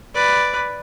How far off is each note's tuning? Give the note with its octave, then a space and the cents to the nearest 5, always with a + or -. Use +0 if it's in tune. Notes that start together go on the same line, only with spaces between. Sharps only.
B4 +0 D5 +0